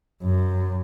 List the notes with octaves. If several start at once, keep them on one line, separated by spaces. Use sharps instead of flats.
F#2